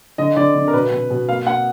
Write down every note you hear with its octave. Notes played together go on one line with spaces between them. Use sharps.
D3 D#5
D3 D5
D3
A#4
B2 B4
B2
B2
A#3 F5
A#3 F#5